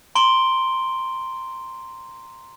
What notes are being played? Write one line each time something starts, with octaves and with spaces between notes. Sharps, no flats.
A#5 C6 D7 G7